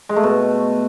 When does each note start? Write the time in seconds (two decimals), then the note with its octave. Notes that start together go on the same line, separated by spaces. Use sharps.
0.09 G#3
0.16 A3
0.23 B2